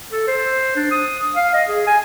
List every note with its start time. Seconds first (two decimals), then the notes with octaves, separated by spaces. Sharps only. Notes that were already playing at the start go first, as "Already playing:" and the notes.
0.12 A4
0.27 C5
0.76 D4
0.91 D#6
1.36 F5
1.54 D#5
1.68 G#4
1.87 G#5